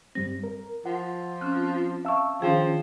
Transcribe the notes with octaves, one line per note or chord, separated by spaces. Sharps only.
G2 G3 C4 A#6
A#4
F3 F#5
C4 C#4 F6 F#6
E5 F5 A5 C#6 E6
D#3 F3 C#4 D4 G#4 F5 G5